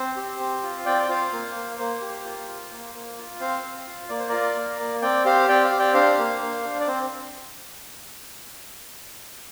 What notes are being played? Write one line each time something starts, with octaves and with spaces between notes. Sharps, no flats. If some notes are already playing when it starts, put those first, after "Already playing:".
Already playing: C4 C5
G4
C4
F4
C4 D5 G5
G5
F4 C5 F5
A#3
A#3
A#3 C5
G4
F4
F4
A#3
A#3
F4
C4 C5 F5
C4
F4
A#3 D5
C5
F4 A#4 D5
A#3
A#3
C4 D5 G5
G4 C5 F5
C4 D5 G5
C5 F5
G4
D5 G5
D4 C5 F5
A#3
A#3
D4
D5
C4 C5